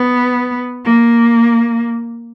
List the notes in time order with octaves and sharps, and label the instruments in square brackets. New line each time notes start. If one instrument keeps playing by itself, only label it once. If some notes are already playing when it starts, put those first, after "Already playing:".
Already playing: [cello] B3
A#3